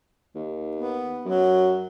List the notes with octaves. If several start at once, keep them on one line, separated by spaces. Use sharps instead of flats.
D#2
B3
F#2 F#3